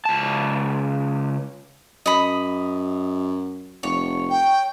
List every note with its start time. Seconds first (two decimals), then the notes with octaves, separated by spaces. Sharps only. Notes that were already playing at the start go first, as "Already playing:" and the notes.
0.05 C#2 A5
2.06 F#2 D#5 B5
3.83 F1 C#5
4.30 G5